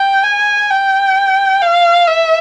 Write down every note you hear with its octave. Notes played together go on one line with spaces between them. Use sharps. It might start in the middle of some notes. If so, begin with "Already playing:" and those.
Already playing: G5
G#5
G5
F5
E5